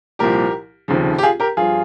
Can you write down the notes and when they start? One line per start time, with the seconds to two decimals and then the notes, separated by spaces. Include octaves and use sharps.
0.19 C2 A#2 F3 G4 A#4
0.88 F1 D#2 C#3 F3
1.18 G4
1.23 F4 G#4
1.40 G4 A#4
1.57 G2 F3 F4 G#4